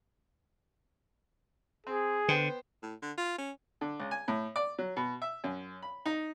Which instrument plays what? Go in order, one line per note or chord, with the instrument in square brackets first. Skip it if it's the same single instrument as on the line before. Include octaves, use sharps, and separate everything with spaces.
[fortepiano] C4 [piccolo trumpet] G#4
[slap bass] D3 [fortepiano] B3 C5 G5
[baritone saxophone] A2
D3
F4
C#4
[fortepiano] D3
C#2
G#5
A2
D5
F#3
B2
E5
F#2
B5
D#4